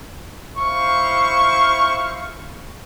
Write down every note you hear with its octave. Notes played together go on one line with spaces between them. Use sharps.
E4 C5 F5 C#6